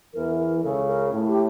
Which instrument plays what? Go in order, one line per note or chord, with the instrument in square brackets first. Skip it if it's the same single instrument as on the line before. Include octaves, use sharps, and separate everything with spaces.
[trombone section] E2 E3 [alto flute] A#4
[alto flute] A#4
[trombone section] C#2 C#3 [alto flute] A4
[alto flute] A#4
[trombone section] A2
[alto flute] G4